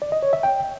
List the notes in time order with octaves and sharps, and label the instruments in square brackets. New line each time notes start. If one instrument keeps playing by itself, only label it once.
[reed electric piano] D5
D#5
C#5
E5
G5